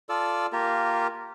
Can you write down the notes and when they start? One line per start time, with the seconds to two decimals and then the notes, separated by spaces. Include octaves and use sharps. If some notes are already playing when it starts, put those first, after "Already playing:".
0.09 F4 A4 D5 E6
0.53 A#3 F4 G4 A#4